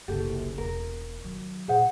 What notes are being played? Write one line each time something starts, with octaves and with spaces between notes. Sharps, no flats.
F#1 C2 G4 A4
E1 A#4
D#3 F#3
A#2 G#4 C5 F#5